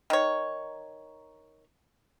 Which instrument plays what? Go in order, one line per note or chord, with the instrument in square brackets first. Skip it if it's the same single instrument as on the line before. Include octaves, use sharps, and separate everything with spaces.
[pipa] D#3 C#5